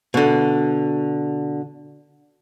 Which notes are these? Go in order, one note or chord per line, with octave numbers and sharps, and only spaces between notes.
B2 D3